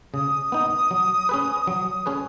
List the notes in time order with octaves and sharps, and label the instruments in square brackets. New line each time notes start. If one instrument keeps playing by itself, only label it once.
[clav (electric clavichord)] C#3 [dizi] D#6
[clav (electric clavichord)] B3 D#4
F#3
C#4 G#4 B4
F#3
C#4 G#4 B4